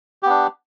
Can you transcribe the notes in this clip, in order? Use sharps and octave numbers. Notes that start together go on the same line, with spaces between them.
B3 D4 G4